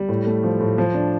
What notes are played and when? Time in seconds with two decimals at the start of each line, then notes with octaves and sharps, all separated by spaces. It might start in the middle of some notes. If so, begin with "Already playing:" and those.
Already playing: G3
0.09 A2
0.26 A3
0.43 F3
0.61 A2
0.78 F3
0.94 D4